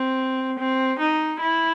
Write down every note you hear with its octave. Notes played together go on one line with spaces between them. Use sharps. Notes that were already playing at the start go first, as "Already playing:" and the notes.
Already playing: C4
C4
D#4
E4